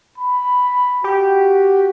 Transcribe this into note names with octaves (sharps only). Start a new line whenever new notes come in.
B5
F#4 G4